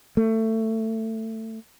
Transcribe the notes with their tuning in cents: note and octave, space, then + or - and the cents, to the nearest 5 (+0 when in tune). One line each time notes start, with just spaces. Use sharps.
A3 +20